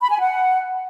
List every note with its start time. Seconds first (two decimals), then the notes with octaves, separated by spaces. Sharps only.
0.01 B5
0.09 G#5
0.18 F#5